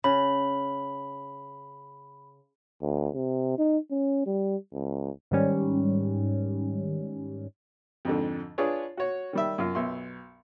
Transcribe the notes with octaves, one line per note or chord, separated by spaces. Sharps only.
C#3 B5
D2
C3
D#4
C#4
G3
C#2
G#2 D#3 G3 C#4
F2 G#2 D3
D4 F4 G#4 B4 C#5
F#4 C#5
D#3 G3 E5
F#2 F4 F5
B1 E5 C6